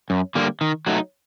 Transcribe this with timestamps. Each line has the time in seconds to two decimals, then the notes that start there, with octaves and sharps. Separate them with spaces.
0.10 F#2
0.35 D3 G3 A#3
0.61 D#3
0.87 F#3 A3 D#4